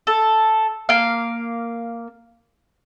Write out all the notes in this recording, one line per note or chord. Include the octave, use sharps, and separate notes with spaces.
A4
A#3 F5